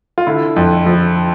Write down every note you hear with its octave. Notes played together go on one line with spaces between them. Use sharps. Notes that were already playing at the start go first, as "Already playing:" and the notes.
F4
D3 E4
F2
F3